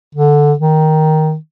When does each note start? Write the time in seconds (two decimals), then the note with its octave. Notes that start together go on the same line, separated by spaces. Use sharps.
0.15 D3
0.59 D#3